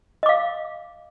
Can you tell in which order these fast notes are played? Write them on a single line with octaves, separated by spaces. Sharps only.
D#5 D6 F5